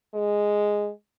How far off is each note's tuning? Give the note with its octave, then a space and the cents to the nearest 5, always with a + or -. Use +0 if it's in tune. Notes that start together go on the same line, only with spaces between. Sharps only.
G#3 -5